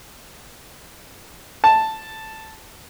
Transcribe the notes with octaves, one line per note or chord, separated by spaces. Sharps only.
A5